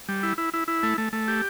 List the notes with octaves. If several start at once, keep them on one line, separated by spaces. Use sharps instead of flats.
G3
E4
E4
E4
E4
A3
A3
A3
G4